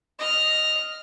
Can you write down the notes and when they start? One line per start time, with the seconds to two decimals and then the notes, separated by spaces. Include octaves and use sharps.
0.20 D#5 F6